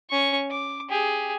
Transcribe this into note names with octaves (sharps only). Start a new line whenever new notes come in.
C#4 C#6
D6
G4 G#4